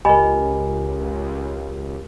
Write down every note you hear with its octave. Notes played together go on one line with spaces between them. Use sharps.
C#2 G4 A#4 D#5 G#5 B5